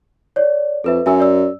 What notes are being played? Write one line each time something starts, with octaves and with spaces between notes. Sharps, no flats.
C#5 D5
F2 A4 B4 E5
F#2 E5 G#5 E6
D5 E6